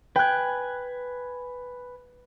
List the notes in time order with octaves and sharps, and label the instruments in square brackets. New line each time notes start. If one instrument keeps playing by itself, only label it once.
[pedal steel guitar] B4 G#5 [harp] G5 F#6